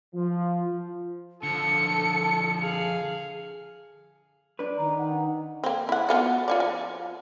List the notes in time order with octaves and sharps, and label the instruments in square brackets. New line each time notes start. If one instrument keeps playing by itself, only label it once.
[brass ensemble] F3
[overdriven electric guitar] D3 F3 [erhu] A4 [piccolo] C#7
[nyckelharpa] G#4 F5
[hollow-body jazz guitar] D4 B4
[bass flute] D#3 [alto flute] A#5
[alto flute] F#5
[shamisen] A#3 C4
E4 F#5
B3 F4 F#4
F4 C#5 D5
F3